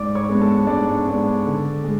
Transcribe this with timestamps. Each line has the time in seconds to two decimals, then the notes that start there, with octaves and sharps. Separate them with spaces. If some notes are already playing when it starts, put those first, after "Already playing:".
Already playing: G#2 D5 D6
0.15 C#5 C#6
0.29 G#3 B3 D4
0.41 A4 A5
0.67 G#2 D4 D5
1.06 G#3 B3 D4
1.46 D3
1.84 G#3